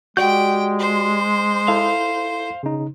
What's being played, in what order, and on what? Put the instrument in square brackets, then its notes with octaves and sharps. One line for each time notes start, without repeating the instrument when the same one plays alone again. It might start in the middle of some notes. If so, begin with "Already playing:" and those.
[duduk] G#3 [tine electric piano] F#4 [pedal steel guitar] G4 D5 G6 [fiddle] G5
[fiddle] C5
[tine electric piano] E4 A4 [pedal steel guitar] F5
[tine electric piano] C#3 D#4